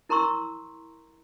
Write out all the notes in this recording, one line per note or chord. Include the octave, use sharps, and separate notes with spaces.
E4 A#4 A#5 C6 C#6 E6